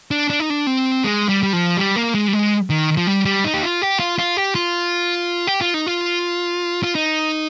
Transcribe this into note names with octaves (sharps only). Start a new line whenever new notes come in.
D4
D4
D#4
D4
C4
G#3
G3
G3
F3
G3
A#3
G#3
G3
G#3
D#3
F3
G3
G3
D#4
G4
F4
G4
F4
F4
G4
F4
G4
F4
D#4
F4
F4
D#4